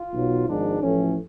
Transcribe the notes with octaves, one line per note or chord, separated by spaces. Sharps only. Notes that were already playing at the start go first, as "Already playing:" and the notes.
Already playing: F4
B1 B2 F#3
G#1 G#2 F3 D4
A1 A2 F3 C#4